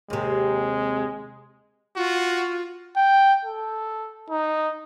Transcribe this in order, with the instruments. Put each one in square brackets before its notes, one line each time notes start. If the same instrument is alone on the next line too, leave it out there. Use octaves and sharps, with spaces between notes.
[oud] D#2 C3 [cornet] G#3
[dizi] F4 [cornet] F#4
[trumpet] G5
A4
D#4